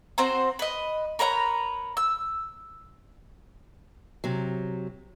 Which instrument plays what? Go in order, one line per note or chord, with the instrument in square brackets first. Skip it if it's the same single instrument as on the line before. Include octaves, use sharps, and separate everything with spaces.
[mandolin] C4 F#4 C5 A#5
B4 D#5
A#4 B4 C#5 A#5
E6
[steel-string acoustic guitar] C3 F#3